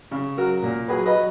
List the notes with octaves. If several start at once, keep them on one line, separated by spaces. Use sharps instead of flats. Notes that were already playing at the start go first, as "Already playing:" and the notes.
C#3
F#3 F#4 A#4
A#2
F#3 G#4 B4
B4 D#5
F#3